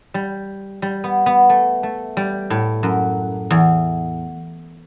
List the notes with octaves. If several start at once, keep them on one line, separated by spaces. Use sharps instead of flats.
G3
G3
B3
B3
A3
A3
G3
A2
F#2
E2